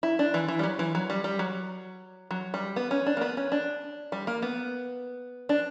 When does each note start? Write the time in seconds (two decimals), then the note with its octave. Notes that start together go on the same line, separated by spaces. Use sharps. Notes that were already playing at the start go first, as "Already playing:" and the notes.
0.03 E4
0.19 D4
0.34 E3
0.48 E3
0.59 G3
0.63 F#3
0.79 E3
0.95 F#3
1.10 G3
1.24 G3
1.39 F#3
2.31 F#3
2.54 G3
2.76 B3
2.91 C#4
3.06 D4
3.17 A#3
3.21 B3
3.37 C#4
3.52 D4
4.12 G3
4.27 A#3
4.42 B3
5.49 D4